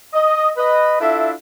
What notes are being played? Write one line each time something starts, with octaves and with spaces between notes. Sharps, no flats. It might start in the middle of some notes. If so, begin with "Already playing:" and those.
D#5
B4 D#5
D4 E4 F4 A4 E5